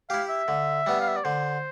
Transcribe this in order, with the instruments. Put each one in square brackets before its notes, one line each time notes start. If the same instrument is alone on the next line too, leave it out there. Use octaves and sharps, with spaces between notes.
[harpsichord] E4 G4 [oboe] F5
[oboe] E5
[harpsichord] D3
G3 B3
[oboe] F5
E5
D5
[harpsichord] D3 [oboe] C5